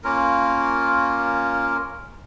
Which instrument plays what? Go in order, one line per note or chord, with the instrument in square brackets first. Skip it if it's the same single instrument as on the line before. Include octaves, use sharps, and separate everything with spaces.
[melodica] A#3 C#4 F4 A#4